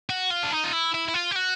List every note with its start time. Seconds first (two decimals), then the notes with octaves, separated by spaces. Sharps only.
0.10 F#4
0.30 F4
0.43 D4
0.52 D#4
0.64 F4
0.73 E4
0.94 E4
1.08 E4
1.14 F4
1.31 G4
1.36 F#4